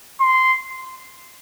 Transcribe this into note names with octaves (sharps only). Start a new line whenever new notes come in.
C6